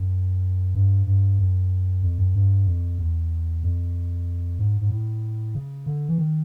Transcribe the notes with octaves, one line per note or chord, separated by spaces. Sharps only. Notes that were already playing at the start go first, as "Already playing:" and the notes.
Already playing: F#2
G2
G2
F#2
F2
F#2
G2
F2
E2
F2
G#2
G#2
A2
C#3
D3
E3
D#3